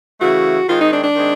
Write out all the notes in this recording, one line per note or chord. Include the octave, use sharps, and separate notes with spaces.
C#3 E3 A3 F#4
D#3 G#3 C4 F4
D#4
D4
D4
D#3 G#3 C4